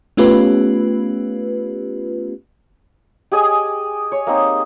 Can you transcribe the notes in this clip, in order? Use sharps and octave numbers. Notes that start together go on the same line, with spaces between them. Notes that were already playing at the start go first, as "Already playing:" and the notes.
A3 B3 C#4 F4 G4 B4
G4 G#4 D#5 G#5
C#5
A#3 C4 D#4